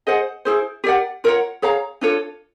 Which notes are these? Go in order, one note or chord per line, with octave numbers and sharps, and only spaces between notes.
G#4 C5 D#5 F#5
E4 G#4 C5
G4 A#4 D5 F#5
F4 A#4 C#5 F#5
G#4 C#5 F5 A#5
D4 F4 A4 C#5